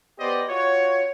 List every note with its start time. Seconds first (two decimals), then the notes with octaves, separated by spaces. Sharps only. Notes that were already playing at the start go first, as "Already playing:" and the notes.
0.18 B3 G4 C5 D5 D#5
0.49 F4 F#4 C#5